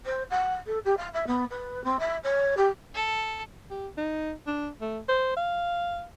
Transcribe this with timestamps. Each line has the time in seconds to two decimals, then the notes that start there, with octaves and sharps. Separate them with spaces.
0.05 C5
0.30 F#5
0.66 A4
0.85 G4
0.97 F5
1.13 E5
1.27 B3
1.50 B4
1.84 C4
1.99 E5
2.24 C#5
2.57 G4
2.94 A4
3.70 G4
3.97 D#4
4.46 D4
4.81 A3
5.08 C5
5.36 F5